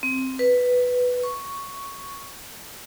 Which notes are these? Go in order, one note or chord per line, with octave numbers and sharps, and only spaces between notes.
C4
B4
C#6